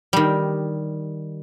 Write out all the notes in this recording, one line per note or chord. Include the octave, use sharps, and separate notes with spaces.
D#3 G3